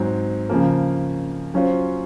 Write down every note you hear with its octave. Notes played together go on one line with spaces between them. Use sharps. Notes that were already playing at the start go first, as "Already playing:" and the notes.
Already playing: G#2 F#3 C4
C#3 F3 A#3
F#3 C#4 F4 C5